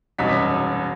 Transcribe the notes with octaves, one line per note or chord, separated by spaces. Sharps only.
E1 C2 F#2 D#4 B6